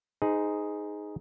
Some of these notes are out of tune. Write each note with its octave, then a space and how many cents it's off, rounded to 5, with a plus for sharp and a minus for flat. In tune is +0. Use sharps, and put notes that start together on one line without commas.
D#4 +0 G#4 +0 C5 -40